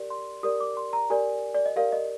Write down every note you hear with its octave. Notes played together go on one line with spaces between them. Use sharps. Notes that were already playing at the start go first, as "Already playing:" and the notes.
Already playing: G4 A#4 D5
C6
G4 A#4 D5 D#6
D6
C6
A#5
G4 A#4 D5 G#5
D5
D#5
G4 A#4 D5 F5
D#5